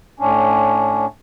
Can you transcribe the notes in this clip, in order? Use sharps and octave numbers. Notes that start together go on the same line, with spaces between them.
A2 C#4 D4